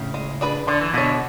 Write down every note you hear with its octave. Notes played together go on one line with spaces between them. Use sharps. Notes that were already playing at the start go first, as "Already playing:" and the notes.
Already playing: A2 C#3
G#3
D4 G#4 B4 D5
D3 D4
E3
B2 D3 F#4 C#5